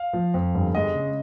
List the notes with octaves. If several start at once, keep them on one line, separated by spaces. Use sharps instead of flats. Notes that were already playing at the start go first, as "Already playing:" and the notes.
Already playing: F5
F3
F2
G1
G#3 D#5
C#3